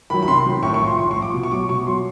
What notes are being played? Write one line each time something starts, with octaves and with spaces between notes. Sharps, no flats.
D#3 F#3 B5
B5
C3 C6
D#3 F#3
A2 C#6
C#6
F3
C6
A2 C6
C#6
F3
D6
B2
C#6
F#3 D6
B2 C#6
F#3 C6